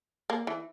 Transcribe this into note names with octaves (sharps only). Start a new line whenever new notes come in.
A#3
E3